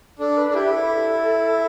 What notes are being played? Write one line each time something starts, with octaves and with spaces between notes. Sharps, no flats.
D4 A4
B4
D4
E4 G4
A4